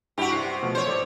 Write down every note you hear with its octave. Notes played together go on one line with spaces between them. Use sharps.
G2 E4 F#4 G4 B5
C3 C7
B2 F3 A3
C5 C#5
G#1 A4 D5